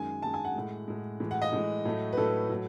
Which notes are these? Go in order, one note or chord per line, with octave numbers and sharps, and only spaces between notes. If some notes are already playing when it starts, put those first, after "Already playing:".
Already playing: F#2 D#3 G#3 G#5
F#2 D#3 G#3 A5
G#5
F#5
A2 G#3
A2 G#3
A2 E3 G#3
F#5
D#5
A2 E3 G#3
A2 F#3 A3
B4
A2 F#3 A3 A4
A2 F#3 A3